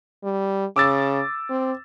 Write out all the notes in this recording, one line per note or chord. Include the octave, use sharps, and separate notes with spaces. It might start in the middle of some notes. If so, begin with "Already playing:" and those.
G3
C#3 D6 E6 A6
C4